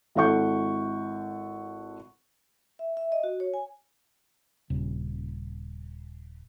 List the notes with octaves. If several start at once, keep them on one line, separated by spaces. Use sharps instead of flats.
G#1 E4 A4 F#5 C#6 G6
E5
E5
D#5
F#4
C#5
G#5
D#1 C#3